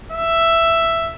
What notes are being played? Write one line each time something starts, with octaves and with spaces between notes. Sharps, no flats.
E5